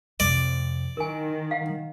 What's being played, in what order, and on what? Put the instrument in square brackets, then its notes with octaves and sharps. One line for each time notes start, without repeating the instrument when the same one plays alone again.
[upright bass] F2 C3 [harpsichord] D5
[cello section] D#3 [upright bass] E4 [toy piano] A#4 G#5
[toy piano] F5 F#5